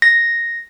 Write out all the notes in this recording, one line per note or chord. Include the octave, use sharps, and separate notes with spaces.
A#6